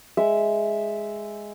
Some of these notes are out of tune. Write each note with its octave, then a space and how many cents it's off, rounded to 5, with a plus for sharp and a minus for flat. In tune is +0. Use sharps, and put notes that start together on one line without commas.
G#3 +0 E5 +0